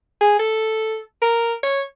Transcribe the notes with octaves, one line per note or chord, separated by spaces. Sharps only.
G#4
A4
A#4
C#5